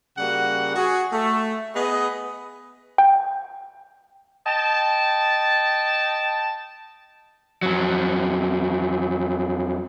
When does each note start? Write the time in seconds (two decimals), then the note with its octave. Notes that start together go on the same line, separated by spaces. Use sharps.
0.18 C#3 G3 A#3 F#4 F#5
0.76 F#4 G#4
1.12 A3
1.75 B3 G#4 B4 D#5
2.98 G5
4.47 D#5 G5 A5
7.62 F2 F#3